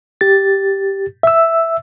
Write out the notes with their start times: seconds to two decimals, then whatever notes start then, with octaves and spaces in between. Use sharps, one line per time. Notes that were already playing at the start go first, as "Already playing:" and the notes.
0.21 G4 A6
1.23 E5 E6